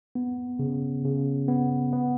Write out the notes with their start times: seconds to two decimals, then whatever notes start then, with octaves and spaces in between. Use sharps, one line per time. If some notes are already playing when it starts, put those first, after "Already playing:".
0.15 B3
0.59 C#3
1.05 C#3
1.48 B3
1.93 B3